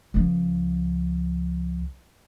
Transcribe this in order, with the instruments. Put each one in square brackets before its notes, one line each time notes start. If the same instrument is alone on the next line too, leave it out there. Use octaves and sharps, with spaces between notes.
[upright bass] C#2 F3